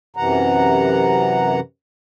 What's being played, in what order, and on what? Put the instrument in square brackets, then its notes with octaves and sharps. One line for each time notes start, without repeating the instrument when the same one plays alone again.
[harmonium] F#2 C3 E3 F#5 A#5